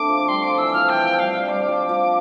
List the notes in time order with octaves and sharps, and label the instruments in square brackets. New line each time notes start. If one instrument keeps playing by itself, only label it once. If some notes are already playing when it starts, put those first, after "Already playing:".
Already playing: [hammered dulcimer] A3 C4 D4 [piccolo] D6
[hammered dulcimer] F3
[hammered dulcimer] G3 [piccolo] C6
[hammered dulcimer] F3 [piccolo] D6
[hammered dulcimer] E3 [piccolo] E6
[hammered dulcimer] F3 [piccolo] F6
[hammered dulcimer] E3 [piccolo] G5
[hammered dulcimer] F3
[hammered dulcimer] G3 [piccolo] F5
[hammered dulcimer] G3
[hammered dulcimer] G3 [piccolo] D6
[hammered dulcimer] F3
F3